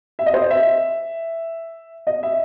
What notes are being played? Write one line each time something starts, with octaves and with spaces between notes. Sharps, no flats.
E5
D#5
C5
D#5
E5
D#5
E5